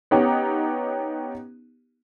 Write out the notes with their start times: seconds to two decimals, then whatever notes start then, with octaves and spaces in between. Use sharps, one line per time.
0.11 B3 C#4 D#4 G4